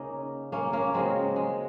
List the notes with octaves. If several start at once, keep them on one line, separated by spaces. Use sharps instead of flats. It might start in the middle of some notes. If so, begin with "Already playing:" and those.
Already playing: C#3 A#3 C#4 D#4
A#3 C#4
A#3 C#4
C#3 F#3 G#3 C4
G#3